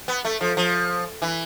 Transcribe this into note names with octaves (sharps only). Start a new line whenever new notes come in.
B3
A3
F3
F3
E3